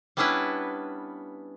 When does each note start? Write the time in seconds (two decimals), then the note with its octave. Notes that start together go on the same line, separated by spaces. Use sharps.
0.17 G3 B3 C#4 D4 E4 B4